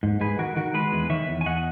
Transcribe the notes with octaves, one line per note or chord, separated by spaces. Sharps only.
G#2
G#2 G#4 B4
D#3 F#4 A#4
D#3 F#4 A#4
G#3 G#4 B4
E2
D#3 C#5 E5
E2
G#5
E2 D#5 F#5